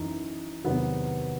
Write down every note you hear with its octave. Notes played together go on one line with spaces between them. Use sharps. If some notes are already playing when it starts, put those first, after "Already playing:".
Already playing: F#2 E3 D#4
E2 C3 D#3 F#3 B3